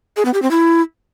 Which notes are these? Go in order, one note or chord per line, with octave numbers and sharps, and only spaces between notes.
G#4
B3
G4
C4
E4